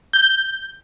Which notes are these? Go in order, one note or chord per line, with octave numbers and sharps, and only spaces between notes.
G6